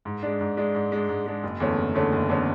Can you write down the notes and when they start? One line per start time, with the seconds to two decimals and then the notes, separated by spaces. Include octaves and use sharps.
0.05 G#2
0.23 G#3 D4
0.41 G#2
0.57 G#3 D4
0.74 G#2
0.92 G#3 D4
1.09 G#2
1.26 G#3 D4
1.43 F#1
1.60 E2 D3 A3 C#4
1.78 F#1
1.94 E2 D3 A3 C#4
2.13 F#1
2.29 E2 D3 A3 C#4